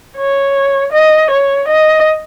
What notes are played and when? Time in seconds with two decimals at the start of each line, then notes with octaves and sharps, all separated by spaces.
0.17 C#5
0.93 D#5
1.31 C#5
1.68 D#5